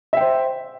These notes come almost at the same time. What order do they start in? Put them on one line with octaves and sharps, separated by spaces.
E5 G5 C5